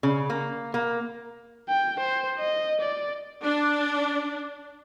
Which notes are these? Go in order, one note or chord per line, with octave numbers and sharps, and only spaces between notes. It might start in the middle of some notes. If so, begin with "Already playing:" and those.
C#3
A#3
A#3
G5
C5
D#5
D5
D4